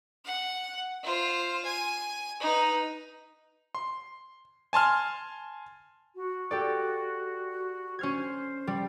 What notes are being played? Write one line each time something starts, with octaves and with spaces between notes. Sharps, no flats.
F#5
F4 C5
G#5
D#4 B4
C6
G#5 A5 C6 F6
F#4
G4 A4 D5
C#4 C5 F6 G#6
G3